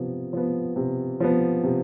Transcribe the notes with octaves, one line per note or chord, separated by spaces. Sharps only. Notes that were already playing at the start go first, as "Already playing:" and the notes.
Already playing: C3 F3 B3
F3 B3
C3
F3 B3
C3